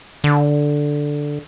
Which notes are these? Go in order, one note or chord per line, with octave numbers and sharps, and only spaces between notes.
D3